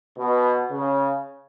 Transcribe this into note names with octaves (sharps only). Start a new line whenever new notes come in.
B2
C#3